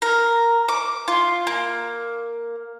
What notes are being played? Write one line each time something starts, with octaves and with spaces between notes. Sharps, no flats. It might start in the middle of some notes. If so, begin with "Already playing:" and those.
A#4
D6
F4
A#3